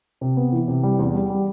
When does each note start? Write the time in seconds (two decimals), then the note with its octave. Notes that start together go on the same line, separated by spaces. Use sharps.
0.21 C3
0.37 B3
0.52 E3
0.68 C3
0.83 G3
0.99 E2
1.15 G3
1.30 G3